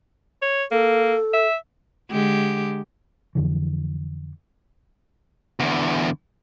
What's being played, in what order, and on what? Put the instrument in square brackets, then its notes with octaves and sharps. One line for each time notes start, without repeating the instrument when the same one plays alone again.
[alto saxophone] C#5
[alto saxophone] A#3 [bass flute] A4
[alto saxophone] E5
[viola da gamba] D3 G#3 G4
[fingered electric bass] F2 D3 E3
[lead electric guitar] E2 D3